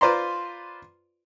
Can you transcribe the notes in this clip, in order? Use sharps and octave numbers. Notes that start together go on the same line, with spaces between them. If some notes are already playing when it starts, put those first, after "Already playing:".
F4 B4 C5 D5 A#5 C6